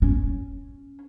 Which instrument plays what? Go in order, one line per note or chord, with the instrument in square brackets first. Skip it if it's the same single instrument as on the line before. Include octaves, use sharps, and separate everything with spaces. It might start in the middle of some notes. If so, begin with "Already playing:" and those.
[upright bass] C#4